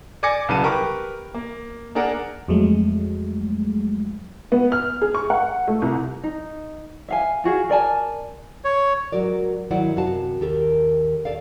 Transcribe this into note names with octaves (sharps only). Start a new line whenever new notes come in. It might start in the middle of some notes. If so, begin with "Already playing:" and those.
D5 G#5 D6 G#6 A#6 C#7
C2 C#3 F#3 B4 A5 D#7
G4 A#4 B4 C#6
A#3
A#3 D4 G#4 A#4 F#5
F2 F#3 G#3 A3
B3
F6
G#4
C#6
F#5
A3
C2
D#4
E5 F5 G#5
F4 F#4 G#4 F5
A#4 D5 G#5 A5
C#5
G#2 F#3 F#4 A#4 D5
D#3 F#3 E4 C5 D5 F#5
F#2 C3 F#4 F5 A5
D#2 G4 A4 A#4
D#2 A#2 A4 D5 F5